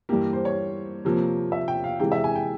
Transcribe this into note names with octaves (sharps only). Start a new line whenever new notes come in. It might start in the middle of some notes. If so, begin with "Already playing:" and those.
G2 E3 A#3 G4
C5
C#5
C3 F3 A#3
E5
G5
F5
C3 E3 G#3 G5
E5
G#5
G5